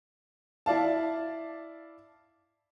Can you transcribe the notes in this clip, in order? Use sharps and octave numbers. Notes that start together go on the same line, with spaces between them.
E4 D5 F5 A5